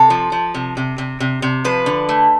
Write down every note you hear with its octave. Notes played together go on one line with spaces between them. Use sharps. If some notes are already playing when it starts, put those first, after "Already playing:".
Already playing: C3 A4
F3
F3
C3
C3
C3
C3
C3
F3 B4
D3
A3